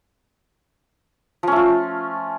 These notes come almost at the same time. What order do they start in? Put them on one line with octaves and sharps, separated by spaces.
F3 C#4 A3 F4